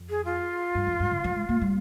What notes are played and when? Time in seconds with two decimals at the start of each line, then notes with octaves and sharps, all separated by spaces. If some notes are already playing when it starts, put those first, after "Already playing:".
Already playing: F2
0.09 G#4
0.25 F4
0.75 G2
0.87 F2
1.00 G2
1.11 D3
1.24 F3
1.36 G#3
1.49 A#3
1.61 G3